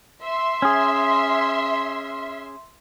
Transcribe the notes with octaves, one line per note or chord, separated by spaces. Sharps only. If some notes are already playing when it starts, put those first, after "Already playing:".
E5 C6
C#4 G#4